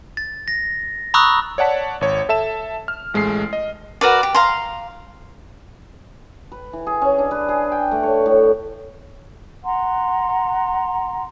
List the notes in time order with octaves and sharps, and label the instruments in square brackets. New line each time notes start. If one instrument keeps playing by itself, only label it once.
[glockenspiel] A6
A#6
A#5 B5 C#6 D#6 E6 F#6
[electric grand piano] C#5 D5 F#5 A5 B6
G#1 C#5
A4 E5 A5 E7
F6
A1 G#3 A3 C7
D#5
[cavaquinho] F#4 A#4 B4 D5
G4
F5 A#5 C6
[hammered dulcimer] B4
E3
G#4
C#4
D4
B4
G#4
G5
A3
C#5
A2
[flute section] F#5 A#5 C6